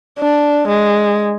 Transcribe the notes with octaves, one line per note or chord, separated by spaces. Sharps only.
D4
G#3